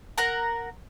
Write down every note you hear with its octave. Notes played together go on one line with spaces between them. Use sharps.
A#4 F#5 A#5